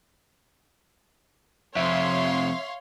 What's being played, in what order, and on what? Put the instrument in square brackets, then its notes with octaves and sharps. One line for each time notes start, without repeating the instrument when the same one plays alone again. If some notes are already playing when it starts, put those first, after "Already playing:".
[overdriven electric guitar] F2 C3 [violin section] C#5 F5 C6 [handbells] E5